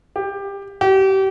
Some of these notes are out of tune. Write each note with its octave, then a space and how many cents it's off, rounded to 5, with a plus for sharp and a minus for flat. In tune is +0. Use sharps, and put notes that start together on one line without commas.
G4 +20
G4 -30